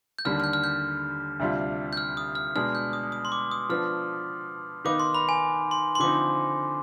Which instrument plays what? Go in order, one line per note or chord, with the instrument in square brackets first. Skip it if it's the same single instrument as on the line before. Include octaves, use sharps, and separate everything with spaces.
[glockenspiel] G6
[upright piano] D#2 D3 G3 D4 [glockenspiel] F6
[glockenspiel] F6
G6
F6
G6
[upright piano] D2 C3 G3 D4 F4
[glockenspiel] G6
F6
D#6
F6
[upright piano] B2 G#3 D4 [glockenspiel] F6
[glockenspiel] G6
D#6
D#6
C6
D6
D#6
[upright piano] F3 B3 D4 [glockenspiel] F6
[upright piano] D#3 B3 D#4 B4 F5 [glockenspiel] D6
[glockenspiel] C6
B5
G#5
C6
C6
[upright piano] D3 F3 C4 D#4 [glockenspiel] D6